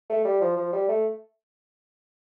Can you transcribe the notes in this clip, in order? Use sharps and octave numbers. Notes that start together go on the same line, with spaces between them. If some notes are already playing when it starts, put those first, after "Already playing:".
A3
G3
F3
F3
G3
A3